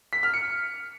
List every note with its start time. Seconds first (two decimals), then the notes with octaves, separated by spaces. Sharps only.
0.13 B6
0.23 F6
0.34 C#7